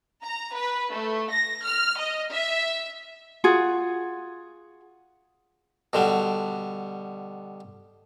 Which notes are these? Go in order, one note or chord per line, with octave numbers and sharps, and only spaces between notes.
A#5
B4
A3
A#6
F6
D#5
E5
F4 F#4 G#4
B2 D3 G3